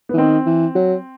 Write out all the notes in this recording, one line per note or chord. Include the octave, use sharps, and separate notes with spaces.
B3
E3
D#3 C4
E3
F#3